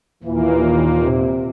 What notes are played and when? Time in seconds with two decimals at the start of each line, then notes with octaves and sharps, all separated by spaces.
0.24 D#2 A#2 E3 A#3
1.02 C3